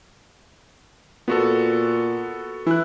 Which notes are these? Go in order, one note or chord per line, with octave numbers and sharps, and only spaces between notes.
A#2 B3 F#4 A4
E3 E4 F#6